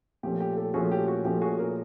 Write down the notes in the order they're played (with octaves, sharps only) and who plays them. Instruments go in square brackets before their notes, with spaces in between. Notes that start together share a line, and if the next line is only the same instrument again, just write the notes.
[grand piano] A#2 F3 A3 C#4 [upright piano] G4
[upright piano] G4
G4 A4
[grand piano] A#2 F3 A3 C#4 [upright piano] F#4 G#4
[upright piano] G4
F#4
[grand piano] A#2 F3 A3 C#4 [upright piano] G4
[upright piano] F#4 G#4
G#4 A#4